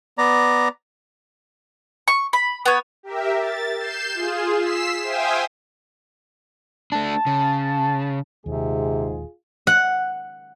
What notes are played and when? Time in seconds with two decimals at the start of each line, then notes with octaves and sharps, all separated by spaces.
0.18 B3 D5 A#5
2.08 C#6
2.33 B5
2.66 B3 C#5
3.03 G4 A#4 E5
3.39 A6
3.78 G6 C7 E7
4.14 F4 G#4
4.61 E6 B6 C7 E7
5.03 C5 E5 F5 G5 G#5 D#6
6.92 A3 D4 A5
7.27 C#3
8.46 D#1 D#2 G#2 C3 F4 G#4
9.67 F#5